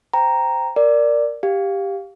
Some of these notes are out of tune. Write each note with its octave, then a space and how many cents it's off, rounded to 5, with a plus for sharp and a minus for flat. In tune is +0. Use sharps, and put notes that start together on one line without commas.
C5 -5 G5 +0 A#5 +0
A#4 +0 D5 +0
G4 +5 F5 +10